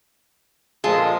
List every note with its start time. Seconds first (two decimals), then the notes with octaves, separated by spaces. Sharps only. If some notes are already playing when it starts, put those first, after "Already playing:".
0.84 A#2 F3 G#3 F4 G#4 A4